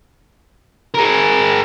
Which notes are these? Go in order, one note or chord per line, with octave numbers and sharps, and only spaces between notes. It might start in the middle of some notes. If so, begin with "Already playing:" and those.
G#4 A#4